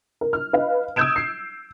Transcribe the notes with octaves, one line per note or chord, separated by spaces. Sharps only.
A#4
F6
B4 D#5 F5
D#6 E6 G6 G#6 D7 E7
C7